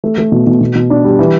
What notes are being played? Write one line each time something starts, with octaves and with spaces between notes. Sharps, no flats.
A3
A3
B2
B2
B2
B2
D4
G3
E3